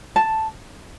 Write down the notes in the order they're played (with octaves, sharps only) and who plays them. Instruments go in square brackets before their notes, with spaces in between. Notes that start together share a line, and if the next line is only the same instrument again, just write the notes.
[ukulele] A5